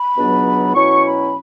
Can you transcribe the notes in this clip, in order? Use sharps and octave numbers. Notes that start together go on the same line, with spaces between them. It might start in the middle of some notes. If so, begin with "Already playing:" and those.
Already playing: B5
C#2 B2 F#3 B3 D4
B2 F#3 C#4 E4 C#6
B5